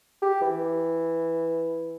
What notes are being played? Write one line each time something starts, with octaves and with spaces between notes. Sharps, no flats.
G4
E3